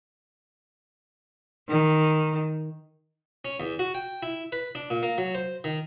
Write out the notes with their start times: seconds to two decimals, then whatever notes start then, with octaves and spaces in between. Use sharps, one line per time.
1.69 D#3
3.45 C#4
3.60 E2
3.79 F#4
3.95 G5
4.23 E4
4.52 B4
4.75 D4
4.90 A#2
5.03 A#3
5.18 F#3
5.35 C5
5.64 D#3